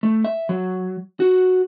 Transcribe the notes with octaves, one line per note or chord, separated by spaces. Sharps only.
A3
E5
F#3
F#4